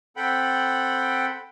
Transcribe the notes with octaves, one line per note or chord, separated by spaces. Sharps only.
C4 A4 F#5 G5 B5